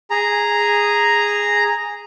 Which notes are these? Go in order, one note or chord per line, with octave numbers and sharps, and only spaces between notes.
G#4 A#5